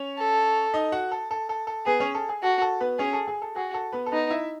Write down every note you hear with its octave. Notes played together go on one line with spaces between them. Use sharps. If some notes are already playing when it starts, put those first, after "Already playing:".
Already playing: C#4 C#5
A4
D#4 D#5
F#4 F#5
A4
A4
A4
A4
B3 G#4 B4
C#4 C#5
A4
G#4
F#4 A4
A4
B3 B4
C#4 G#4 C#5
A4
G#4
A4
F#4 G#4
A4
B3 B4
A4
B3 D#4 B4
E4 E5